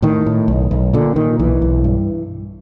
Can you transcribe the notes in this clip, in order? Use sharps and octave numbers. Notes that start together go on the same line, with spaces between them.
A2 D#3
A2
B1
B1
A#2 D3
A#2 D#3
B1 E3
B1
G2